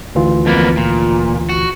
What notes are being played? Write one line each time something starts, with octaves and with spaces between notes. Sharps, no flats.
D2 E3 F4
F2 A#3 B3
A#2
F#4